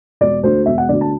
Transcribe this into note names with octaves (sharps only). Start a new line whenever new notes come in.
E1 D5
D2 D3 C5
E1 E5
F#5
D2 D3 D5
A5